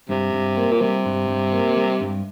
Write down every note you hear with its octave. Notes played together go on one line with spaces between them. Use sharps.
G2 C3
G2
A#3
A#2
C3 G3
G2
G2
A#3
G3
G2